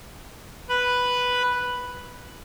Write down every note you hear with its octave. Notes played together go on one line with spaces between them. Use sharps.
B4 B5